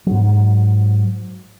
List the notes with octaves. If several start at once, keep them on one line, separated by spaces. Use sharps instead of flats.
G#2 F#3